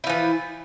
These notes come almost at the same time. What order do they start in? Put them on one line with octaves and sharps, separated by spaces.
E4 F3 E3